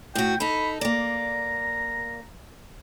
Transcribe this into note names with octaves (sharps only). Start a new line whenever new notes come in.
A2 F#4 G5
D#4 A4 B5
A#3 D5 A#5